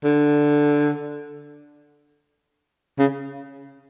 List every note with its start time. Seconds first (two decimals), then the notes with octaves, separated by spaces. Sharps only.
0.04 D3
2.99 C#3